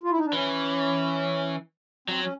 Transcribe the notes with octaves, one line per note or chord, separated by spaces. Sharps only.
F4
E4
D#4
D4
E3 C#4
F#3 C4
C#4